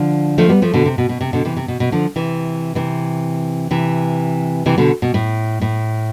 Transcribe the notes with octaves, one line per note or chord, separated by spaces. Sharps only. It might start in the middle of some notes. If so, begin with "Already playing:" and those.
Already playing: D3 F3
F3 A3
G3 B3
F3 A3
B2 D3
C3
B2
B2
C3
B2 D3
C3 E3
C3
B2
B2
D3 F3
C3 E3
C3 E3
C3 E3
C3 E3
B2 D3
B2
A2
A2